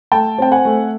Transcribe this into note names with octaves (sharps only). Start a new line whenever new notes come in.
A3 G5 A5
C4 G5
F#5 G#5
A3